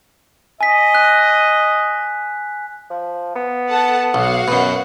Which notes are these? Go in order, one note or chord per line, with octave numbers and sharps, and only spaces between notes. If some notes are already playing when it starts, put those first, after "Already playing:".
D#5 G#5 B6
F#6
F3
B3
A4 F#5 A5
B1 F#4 F5 F#5
F#2 B2 B4